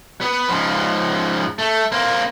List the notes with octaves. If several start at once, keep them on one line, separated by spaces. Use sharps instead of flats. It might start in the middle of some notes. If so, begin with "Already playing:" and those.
B3
G#2 F3
A3
A#3 C4